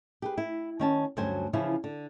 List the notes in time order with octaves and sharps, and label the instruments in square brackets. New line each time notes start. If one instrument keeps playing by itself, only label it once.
[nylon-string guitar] G4 G#4 B4
E4
D#3 C#4 A5
D2 G2 F#3 C#4 C5 G#5
C#3 E3 F3 C#4 E4 F4
D3